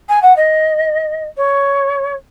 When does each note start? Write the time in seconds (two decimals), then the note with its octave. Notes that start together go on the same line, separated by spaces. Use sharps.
0.09 G#5
0.22 F#5
0.36 D#5
1.37 C#5